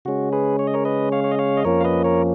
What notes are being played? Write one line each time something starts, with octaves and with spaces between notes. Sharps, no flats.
C#3 G#3 C#4 F#4
G#4 B4
C#5
D#5
A#4 C#5
B4 D#5
C#5 F5
C#5
D#5
C#5 F5
D#5
F2 F3 A#3 C#4 A#4 C#5
F5
B4 D#5
A#4 C#5